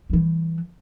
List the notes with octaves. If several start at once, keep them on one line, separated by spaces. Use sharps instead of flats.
E3 G3